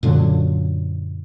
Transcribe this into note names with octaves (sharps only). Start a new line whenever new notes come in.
F#2 A#2 D3 F#3